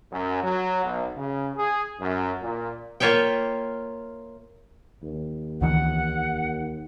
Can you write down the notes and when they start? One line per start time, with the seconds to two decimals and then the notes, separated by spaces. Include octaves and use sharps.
0.11 F#2
0.42 F#3
0.83 B1
1.15 C#3
1.55 G#4
2.00 F#2
2.41 A#2
3.00 A#3 F4 C#5 E5 G5
5.02 D#2
5.61 C#2 D#3 E3 F#5